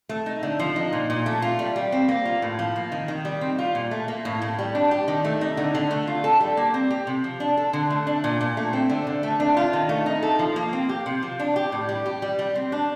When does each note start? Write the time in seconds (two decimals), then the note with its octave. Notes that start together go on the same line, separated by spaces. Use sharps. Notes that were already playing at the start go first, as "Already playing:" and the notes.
0.09 A3
0.26 D#4
0.43 D3
0.59 F3
0.76 D#4
0.93 A#2
1.10 A#2
1.26 A3
1.42 F4
1.59 G3
1.76 G3
1.92 C4
2.09 A#3
2.25 F4
2.42 A2
2.59 F3
2.76 A#3
2.92 D#3
3.08 D#3
3.25 G3
3.41 C4
3.59 F4
3.75 A#2
3.91 A3
4.08 A#3
4.25 A2
4.42 A2
4.59 G3
4.75 D4
4.91 G4
5.08 D#3
5.25 A3
5.41 D#4
5.57 D3
5.75 D3
5.91 A3
6.07 F4
6.24 A4
6.40 G3
6.57 A#3
6.74 C4
6.90 G4
7.07 C3
7.24 F3
7.40 D4
7.57 A4
7.73 D3
7.90 A3
8.07 D4
8.24 A#2
8.41 A#2
8.57 A3
8.73 C4
8.90 D3
9.07 D3
9.23 A3
9.40 D4
9.57 F4
9.73 D#3
9.89 A3
10.06 D#4
10.23 A4
10.39 F3
10.56 A#3
10.73 C4
10.89 G4
11.06 C3
11.23 F3
11.39 D4
11.56 G4
11.72 A2
11.89 G3
12.06 G4
12.22 G3
12.39 G3
12.55 C4
12.72 D4